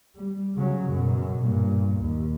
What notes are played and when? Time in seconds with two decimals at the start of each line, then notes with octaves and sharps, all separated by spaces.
0.15 G3
0.56 C#3 F#3
0.90 F#2 B2
1.42 G2 A#2
1.98 D#2